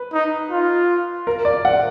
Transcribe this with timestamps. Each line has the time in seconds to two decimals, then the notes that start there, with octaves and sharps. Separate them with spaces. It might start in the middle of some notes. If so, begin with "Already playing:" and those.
Already playing: B4
0.13 D#4
0.51 F4
1.27 A#4
1.45 D5
1.65 F#5